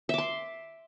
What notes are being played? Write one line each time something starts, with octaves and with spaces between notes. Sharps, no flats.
E5 C6 D6